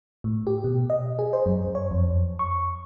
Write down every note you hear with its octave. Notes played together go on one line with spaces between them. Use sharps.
A2
G4
B2
D#5
G#4
C5
F#2
C#5
F2
C#6